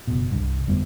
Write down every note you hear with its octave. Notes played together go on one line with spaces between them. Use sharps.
F#1 B2
C2 G2
G1 F2 G3 B3